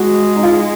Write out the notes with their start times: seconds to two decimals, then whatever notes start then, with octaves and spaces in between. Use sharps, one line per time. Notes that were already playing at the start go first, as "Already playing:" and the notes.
Already playing: G#3 F#4
0.36 D#4
0.43 F4